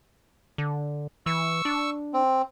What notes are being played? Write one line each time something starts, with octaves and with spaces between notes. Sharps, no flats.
D3
E3 C#6 E6
D4
C4